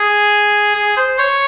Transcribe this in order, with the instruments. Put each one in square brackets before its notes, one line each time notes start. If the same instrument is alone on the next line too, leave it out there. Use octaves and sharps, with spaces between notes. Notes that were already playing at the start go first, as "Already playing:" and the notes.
Already playing: [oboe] G#4
G#4
C5
C#5